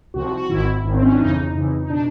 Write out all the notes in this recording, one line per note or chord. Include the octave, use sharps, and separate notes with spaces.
C2 C3 F3 F#4
F#4
F#4
G#1 G#2 D#3 E4
G#1 G#2 D#3
C4
C#4
D4
F2 C#3 E3 D#4
F2 C#3 E3
D#4
B2 D4